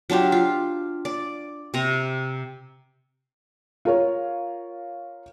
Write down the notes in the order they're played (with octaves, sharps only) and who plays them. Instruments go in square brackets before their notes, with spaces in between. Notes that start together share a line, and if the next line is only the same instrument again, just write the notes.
[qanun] F#3 D4 F4 G4
F4
D5
C3 A#5
[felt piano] F4 A#4 C#5